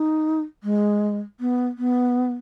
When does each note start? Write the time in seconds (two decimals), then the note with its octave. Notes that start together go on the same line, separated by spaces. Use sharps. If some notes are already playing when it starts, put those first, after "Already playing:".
Already playing: D#4
0.64 G#3
1.40 B3
1.78 B3